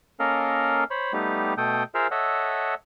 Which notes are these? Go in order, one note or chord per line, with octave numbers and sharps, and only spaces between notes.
A#3 C#4 A4 A#4 D#5 F5
C5 C#5 B5
G3 A3 B3 D#4 G4
B2 A3 A4 G5 D#6 G6
F4 G#4 A#4 C5 E5 F5
A4 C#5 D#5 E5 F#5